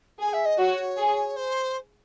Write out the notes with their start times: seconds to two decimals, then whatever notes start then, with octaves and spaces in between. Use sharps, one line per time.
0.19 G#4 G#5
0.33 E5
0.45 D#5
0.58 F#4 C#5
0.98 G#4
1.36 C5